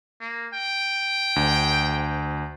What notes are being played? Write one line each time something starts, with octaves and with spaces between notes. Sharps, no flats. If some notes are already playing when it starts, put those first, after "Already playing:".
A#3
G5
D2